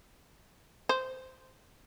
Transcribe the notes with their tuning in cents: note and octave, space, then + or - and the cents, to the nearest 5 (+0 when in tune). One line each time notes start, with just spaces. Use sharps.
C5 -15